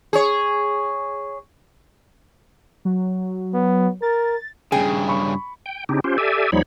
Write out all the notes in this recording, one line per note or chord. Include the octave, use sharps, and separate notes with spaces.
G#4 C#5
F#3
B3
A#4 A6
G2 C#3 G#4 G5
B5 C#6
G5
C#3 C4 D4 D#4 G4
C#4 F4 G4 C5
G4 A4 D5 E5 G#5
D#2 F3 G3 D#4 C#5 B5